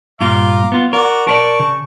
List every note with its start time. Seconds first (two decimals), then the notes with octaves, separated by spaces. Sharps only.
0.21 G2 A#2 F4 F5 A#5 D6
0.72 B3 F4
0.93 F#4 A#4 D5
1.27 A#4 B4 D5 A5 C#6
1.60 C#3